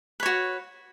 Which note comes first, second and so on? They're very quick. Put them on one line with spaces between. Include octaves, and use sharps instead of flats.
B4 C#5 F#4